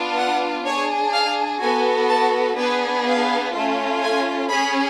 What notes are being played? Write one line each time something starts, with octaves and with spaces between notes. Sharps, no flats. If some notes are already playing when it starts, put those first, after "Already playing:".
Already playing: B3 D4 F4
F#5
D4 G#4 C#5
F5
B3 F#4 A4 G#5
A5
B3 D4 G#4 B4
F5
A3 C#4 F4
G#5
C#4 G#4 B5